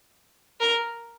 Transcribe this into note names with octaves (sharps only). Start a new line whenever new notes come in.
A#4